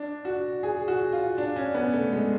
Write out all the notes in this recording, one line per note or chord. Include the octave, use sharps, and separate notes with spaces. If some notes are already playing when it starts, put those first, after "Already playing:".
Already playing: D4
F#4
G#4
F#4
F4
D4
C#4
B3
A3
G#3